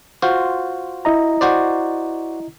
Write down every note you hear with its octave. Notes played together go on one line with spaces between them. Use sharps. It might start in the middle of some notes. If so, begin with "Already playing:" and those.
F4 F#4 C5
E4 D#5 A#5
F#4 C5 D5